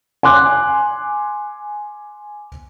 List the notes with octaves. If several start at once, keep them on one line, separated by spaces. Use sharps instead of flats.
G#5 C6 D6 F#6